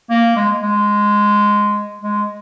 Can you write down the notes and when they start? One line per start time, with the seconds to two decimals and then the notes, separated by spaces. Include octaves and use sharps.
0.10 A#3
0.36 G#3
0.63 G#3
2.01 G#3